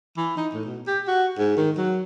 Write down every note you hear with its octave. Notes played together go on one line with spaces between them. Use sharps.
E3
D#4
A2
B2
G4
F#4
G#2
D#3
F#3